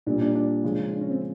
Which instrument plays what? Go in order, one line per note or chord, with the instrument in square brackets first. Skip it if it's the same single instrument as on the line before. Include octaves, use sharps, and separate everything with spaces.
[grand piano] A#2 G3 A#3 [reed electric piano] D4
[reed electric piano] D4
D4
[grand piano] C#3 F3 G#3
[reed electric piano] D4
C#4
C4